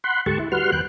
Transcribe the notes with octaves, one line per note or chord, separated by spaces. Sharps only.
F#5 B5 C6
D2 G#2 G4 A4 A5 C#6
E4
G3 F#4 B4 F#5 C6 F6
D#2 B4 G5 F#6